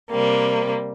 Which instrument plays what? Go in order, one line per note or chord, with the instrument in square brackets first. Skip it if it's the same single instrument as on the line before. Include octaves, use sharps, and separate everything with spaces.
[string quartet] C3 G3 A#3